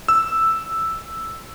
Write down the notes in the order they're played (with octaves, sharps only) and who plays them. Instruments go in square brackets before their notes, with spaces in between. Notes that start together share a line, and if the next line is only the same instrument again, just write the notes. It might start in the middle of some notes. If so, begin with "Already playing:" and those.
[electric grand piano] E6